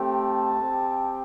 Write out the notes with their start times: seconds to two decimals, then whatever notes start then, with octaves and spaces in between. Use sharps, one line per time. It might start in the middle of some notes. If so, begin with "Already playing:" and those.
Already playing: A3 C4 G4
0.13 A5
0.63 C4 G4